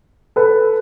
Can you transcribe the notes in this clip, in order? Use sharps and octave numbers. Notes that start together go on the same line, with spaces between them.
A4 B4